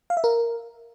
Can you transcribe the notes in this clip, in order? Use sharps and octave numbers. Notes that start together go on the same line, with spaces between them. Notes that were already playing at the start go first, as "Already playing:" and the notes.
F5
E5
A#4